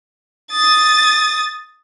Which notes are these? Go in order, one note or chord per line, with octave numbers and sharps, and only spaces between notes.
D#6 A6